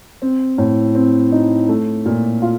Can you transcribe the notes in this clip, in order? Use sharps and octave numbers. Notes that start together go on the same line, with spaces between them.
C4
A2
C4
D#4
A3
A#2
F4